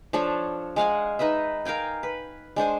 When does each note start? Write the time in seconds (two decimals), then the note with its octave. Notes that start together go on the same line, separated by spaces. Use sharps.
0.13 F3 D4 A4 C#5
0.76 G#3 F5 F#5 G#5
1.19 D#4 B4 D#5 E5
1.65 A#4 F5 G5 G#5
2.03 B4
2.56 G#3 D4 C5 G#5